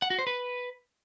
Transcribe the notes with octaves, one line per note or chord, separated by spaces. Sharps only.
F#5
F#4
C5
B4